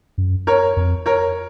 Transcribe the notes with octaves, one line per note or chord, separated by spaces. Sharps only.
F#2
A#4 C#5
F2
A#4 C#5